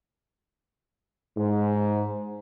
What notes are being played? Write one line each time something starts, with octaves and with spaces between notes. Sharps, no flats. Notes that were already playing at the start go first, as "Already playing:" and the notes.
G#2